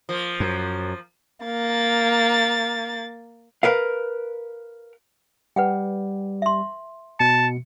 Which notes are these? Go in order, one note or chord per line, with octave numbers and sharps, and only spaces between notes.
F3 A#3
F#2
A#3 A6
A#4 B4 F5
G3 B4 F#5 G5
E5 C6
B2 A5 C#7